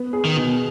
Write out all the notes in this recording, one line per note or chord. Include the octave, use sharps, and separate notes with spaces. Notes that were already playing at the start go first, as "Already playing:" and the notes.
Already playing: B3
G#4
D#3
B2